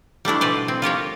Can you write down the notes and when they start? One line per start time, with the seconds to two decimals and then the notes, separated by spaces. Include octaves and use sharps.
0.25 G3 A3 D4 E4
0.41 B2 B4 C5 D5
0.68 C4
0.82 F4 G4 A#4 C#5